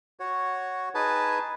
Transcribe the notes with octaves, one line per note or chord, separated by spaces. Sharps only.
F#4 C#5
D#4 G#4 B4 G#5 A5